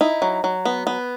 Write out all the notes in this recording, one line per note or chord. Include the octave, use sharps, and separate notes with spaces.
D#4 E4
F#3
F#3
B3
B3